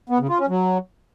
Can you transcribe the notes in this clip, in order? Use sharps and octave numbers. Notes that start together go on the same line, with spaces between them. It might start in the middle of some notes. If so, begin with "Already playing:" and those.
B3
C#3
F4
C#4
F#3